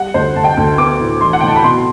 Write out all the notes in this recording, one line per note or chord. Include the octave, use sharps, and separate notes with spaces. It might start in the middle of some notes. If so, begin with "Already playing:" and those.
Already playing: G3 F#5
D2 C5
D2 A5
G5
D2 A5
B3 D6
A2
E3 C6
F#5
A2 G5
A5
B5
B2 C6